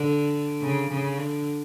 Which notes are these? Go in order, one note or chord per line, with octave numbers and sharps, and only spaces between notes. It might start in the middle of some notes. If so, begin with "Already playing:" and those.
Already playing: D3
C#3
C#3
D3